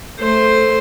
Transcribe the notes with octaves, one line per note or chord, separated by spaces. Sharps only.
A3 C5